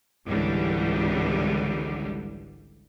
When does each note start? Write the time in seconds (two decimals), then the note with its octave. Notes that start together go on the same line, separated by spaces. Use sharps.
0.27 G#1 C#2 G#2 D3 E3 G3